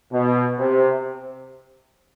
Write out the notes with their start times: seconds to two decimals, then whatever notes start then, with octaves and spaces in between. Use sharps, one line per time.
0.12 B2
0.58 C3